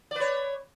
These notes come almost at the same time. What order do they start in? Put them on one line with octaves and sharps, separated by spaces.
D5 B4 C#5